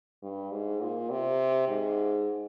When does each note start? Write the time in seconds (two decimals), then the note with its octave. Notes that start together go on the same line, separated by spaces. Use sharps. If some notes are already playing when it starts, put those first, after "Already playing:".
0.22 G2
0.51 G#2
0.81 A#2
1.10 C3
1.68 G#2